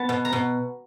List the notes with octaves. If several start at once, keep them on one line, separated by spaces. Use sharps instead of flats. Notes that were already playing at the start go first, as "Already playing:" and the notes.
Already playing: B3 A5
B2
A#5
B2